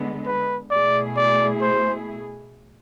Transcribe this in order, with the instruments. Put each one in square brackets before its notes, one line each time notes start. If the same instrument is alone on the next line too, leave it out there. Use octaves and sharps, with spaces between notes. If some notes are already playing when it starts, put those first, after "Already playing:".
Already playing: [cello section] D3 G#3 B3
[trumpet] B4
[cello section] B2 A3 E4 G#4 [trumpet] D5
[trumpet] D5
C5